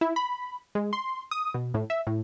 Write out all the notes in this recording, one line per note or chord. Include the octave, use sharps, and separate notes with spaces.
E4
B5
G#3
C6
D#6
B2
A2
E5
A2